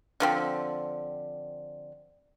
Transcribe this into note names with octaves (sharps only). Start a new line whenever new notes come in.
D3 F3 C4